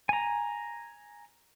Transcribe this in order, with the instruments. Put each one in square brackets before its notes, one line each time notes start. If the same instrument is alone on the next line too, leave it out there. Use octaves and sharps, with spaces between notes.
[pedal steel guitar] G#5 A#5